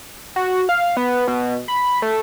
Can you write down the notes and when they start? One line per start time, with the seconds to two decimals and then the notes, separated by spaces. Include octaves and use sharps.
0.36 F#4
0.69 F5
0.97 B3
1.28 B2
1.68 B5
2.02 A3